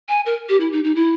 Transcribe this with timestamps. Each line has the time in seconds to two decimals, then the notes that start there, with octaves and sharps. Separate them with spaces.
0.09 G#5
0.26 A#4
0.49 G4
0.60 E4
0.72 D#4
0.84 D#4
0.96 E4